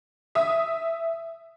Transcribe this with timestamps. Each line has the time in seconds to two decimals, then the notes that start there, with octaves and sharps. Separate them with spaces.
0.35 E5 D#6